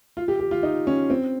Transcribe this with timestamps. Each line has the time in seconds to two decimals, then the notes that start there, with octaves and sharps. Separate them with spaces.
0.17 F4
0.28 G4
0.40 G4
0.51 F4
0.63 D#4
0.87 C#4
1.10 C4